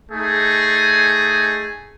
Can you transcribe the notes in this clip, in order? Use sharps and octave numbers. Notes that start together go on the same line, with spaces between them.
A3 D#4 G#4